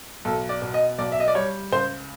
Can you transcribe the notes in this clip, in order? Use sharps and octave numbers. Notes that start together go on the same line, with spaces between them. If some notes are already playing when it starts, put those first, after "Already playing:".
B1 A4
D5
B2
D#5
B1 D5
E5
D#5
D5
G3 C#5
C#2 C5